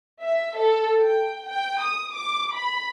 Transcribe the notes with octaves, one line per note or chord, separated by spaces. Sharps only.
E5
A4
G5
G5
D#6
D6
B5